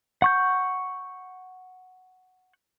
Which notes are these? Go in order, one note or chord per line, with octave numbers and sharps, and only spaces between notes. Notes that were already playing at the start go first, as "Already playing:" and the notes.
F#5 C#6 G6